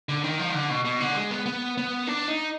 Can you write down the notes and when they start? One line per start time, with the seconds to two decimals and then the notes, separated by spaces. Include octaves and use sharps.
0.09 D3
0.23 D#3
0.39 F3
0.50 D#3
0.54 D3
0.70 B2
0.85 B2
1.00 D3
1.16 G#3
1.31 B3
1.46 B3
1.77 B3
2.07 D4
2.28 D#4